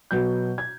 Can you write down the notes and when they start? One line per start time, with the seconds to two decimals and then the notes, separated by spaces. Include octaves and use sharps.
0.11 B2 F#3 G6
0.58 G#6